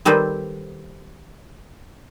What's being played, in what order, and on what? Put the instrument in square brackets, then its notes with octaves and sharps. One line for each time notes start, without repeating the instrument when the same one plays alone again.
[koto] D#3 G3 C4 A4 B4 C5